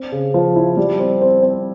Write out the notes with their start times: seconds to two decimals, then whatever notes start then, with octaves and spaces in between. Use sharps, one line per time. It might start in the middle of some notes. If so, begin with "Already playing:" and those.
Already playing: C4
0.12 C#3
0.34 F3
0.56 E4
0.77 G3
0.99 C4
1.22 C4
1.43 C4